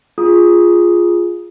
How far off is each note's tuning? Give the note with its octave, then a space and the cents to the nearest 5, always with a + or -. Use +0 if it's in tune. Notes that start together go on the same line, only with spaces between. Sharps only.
F4 +0 G#4 +0 D#6 +0